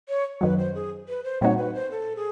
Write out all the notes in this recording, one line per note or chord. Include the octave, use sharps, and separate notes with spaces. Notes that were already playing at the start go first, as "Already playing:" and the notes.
C#5
F#2 D#3 F#3 B4
C5
G#4
B4
C5
A#2 G3 C4 D#4 F#4 C#5
B4
C5
A4
G#4